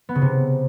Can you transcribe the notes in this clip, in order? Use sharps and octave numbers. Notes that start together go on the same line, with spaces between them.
B3
C#3
C3